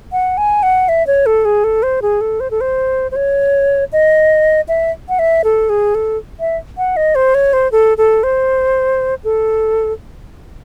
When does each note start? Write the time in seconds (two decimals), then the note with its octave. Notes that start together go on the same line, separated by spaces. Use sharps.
0.12 F#5
0.37 G#5
0.63 F#5
0.89 E5
1.07 C#5
1.26 A4
1.45 G#4
1.64 A4
1.83 C5
2.02 G#4
2.21 A4
2.40 C5
2.51 A4
2.61 C5
3.11 C5
3.16 C#5
3.92 D#5
4.68 E5
5.09 F#5
5.19 E5
5.44 A4
5.69 G#4
5.95 A4
6.40 E5
6.78 F#5
6.97 D#5
7.15 C5
7.35 C#5
7.53 C5
7.72 A4
7.98 A4
8.23 C5
9.24 A4